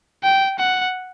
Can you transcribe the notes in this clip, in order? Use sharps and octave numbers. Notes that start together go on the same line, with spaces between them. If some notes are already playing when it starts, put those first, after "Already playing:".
G5
F#5